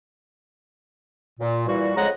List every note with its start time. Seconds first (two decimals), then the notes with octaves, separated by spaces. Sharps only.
1.40 A#2
1.68 A#2 E3 G3 F#4
1.97 F2 C#3 G#3 D#5 F#5 A#5